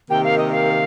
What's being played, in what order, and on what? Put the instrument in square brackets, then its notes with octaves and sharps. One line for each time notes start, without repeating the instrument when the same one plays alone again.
[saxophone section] C3 D#3 A#3 G4 [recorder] G5
[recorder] F5
D#5
F5